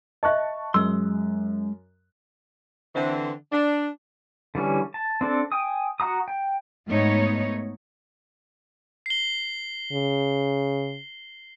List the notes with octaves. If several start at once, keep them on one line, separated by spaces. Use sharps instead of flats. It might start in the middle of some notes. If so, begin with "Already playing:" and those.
D#5 E5 A5 C#6 F#6
F#2 G#3 C6 E6
D3 E3 C4
D4
D3 E3 G3 C#4
A5
C4 D4 A4
G5 G#5 D#6
F#4 F#5 A#5 D#6
G5
G#2 A3 B3 D#4 C#5
C7 G7
C#3